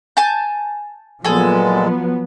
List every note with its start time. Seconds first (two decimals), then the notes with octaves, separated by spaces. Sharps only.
0.17 G#5 A5 G6
1.24 A#2 F3 F#3 G#3 B3 G#4 A4